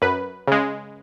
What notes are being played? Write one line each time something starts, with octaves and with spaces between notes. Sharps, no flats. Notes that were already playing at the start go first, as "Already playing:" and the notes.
F#2 B4
C#3 G#3